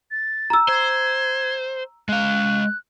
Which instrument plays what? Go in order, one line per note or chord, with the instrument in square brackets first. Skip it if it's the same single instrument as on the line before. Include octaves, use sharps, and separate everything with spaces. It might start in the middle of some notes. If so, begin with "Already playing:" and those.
[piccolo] A6
[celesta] A#5 E6
[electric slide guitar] C5 [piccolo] G#6
[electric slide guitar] G#3 F5 [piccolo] F#6